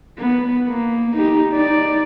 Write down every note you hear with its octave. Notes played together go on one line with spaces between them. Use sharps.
B3
A#3
D#4 G4
D#4 D5